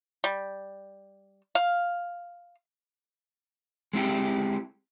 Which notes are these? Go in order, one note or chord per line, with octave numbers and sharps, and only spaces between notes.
G3
F5
G#3 C4 E4 G4